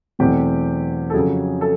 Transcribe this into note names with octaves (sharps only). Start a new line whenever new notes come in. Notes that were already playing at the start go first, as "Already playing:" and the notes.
E2 B2 F#3 A3 C4 G4
A4
F2 C#3 F#3 G#4
A4